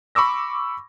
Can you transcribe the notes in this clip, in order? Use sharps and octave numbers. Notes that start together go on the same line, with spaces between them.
B5 C#6 D6 E6 A#6